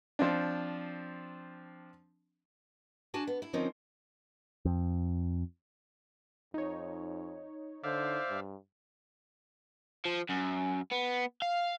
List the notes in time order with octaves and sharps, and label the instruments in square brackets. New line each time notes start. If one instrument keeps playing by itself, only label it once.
[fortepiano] F3 C4 D4
[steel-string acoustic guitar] D4 F#4 G#5 A5
B3
E4
D2 F3 C4 C#4 D#4 A#4
[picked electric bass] F2
[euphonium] F2 [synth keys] D#4 C#5
[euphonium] D3 [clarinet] C5 [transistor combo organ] D5 E5 F5
[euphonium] G2
[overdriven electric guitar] F3
F#2
B3
F5